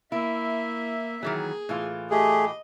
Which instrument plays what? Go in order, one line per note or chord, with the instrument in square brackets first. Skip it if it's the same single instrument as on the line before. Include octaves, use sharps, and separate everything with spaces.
[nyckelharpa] A#3 [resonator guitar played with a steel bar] E4 [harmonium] E5
[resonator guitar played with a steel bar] D#3 E3 F#3 [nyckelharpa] G#4
[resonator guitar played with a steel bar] A2 E3 F4
[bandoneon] A3 G#4 [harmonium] G4 [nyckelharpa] D#5